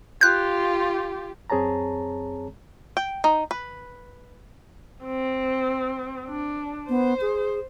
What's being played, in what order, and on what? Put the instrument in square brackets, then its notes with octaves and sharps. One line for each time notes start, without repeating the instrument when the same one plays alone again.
[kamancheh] F4 G4 [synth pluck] F#6 G6
[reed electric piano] F#2 C4 G#4 C#5 A5 A#5
[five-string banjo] G5
D#4
B4
[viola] C4
D4
[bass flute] B3 [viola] C5
[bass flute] G#4